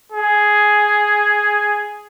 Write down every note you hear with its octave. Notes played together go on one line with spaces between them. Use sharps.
G#4